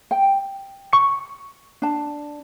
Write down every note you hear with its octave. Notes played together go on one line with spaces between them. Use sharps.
G5
C#6 C#7
D4 A5